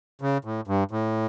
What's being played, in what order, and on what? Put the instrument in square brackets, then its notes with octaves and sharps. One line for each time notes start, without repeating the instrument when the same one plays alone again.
[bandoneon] C#3
A2
G2
A2